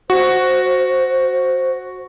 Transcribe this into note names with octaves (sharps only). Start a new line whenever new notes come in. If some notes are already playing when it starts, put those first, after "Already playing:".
F#4 C5